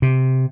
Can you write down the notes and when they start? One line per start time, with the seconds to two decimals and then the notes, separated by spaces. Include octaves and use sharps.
0.02 C3